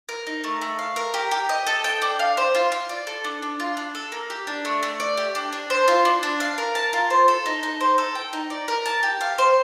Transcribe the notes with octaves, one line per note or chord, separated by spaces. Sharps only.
A#4
D#4
A3
A3
F5
A#4
G4
G4
D#5
A4
G5
D4
F5
C5
F4
F4
D5
A4
D4
D4
F4
D4
A4
A#3
G4
D4
A3
A3
D5
G4
D4
D4
C5
F4
D4
D4
F5
A#4
A5
F4
C5
A4
D#4
D#4
C5
A4
G5
D#4
D5
A#4
A5
G4
F5
C5